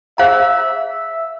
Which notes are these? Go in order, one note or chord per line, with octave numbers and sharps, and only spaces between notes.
G#4 C5 E5 F5 A#5
E5